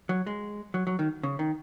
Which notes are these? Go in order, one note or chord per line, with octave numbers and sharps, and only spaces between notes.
F#3
G#3
F#3
F#3
D#3
C#3
D#3